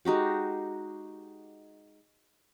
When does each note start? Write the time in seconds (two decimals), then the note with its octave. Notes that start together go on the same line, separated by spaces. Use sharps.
0.05 G#3 D#4 F#4 G4